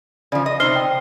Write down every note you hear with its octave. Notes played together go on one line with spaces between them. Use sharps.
C#3 F3 D5
D#5
C3 D#4 C5 F6 C7 G7
G5